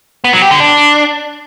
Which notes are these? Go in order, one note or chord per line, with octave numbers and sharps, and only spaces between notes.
B3
F#3
G4
D3
D4